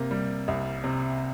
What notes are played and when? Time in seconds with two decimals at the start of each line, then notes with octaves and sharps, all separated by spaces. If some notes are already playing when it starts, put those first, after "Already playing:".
Already playing: C3 A#3
0.11 G3
0.48 C2
0.84 C3